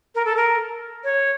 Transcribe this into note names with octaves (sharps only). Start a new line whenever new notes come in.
A#4
A4
A#4
C#5